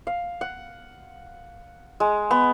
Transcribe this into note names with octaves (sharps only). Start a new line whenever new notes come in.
F5
F#5
G#3
B3